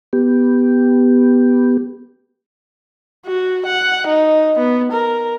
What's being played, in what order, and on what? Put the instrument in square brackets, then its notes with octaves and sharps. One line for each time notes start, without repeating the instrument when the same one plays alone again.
[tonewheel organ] B3 G4
[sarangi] F#4
F#5
D#4
B3
A#4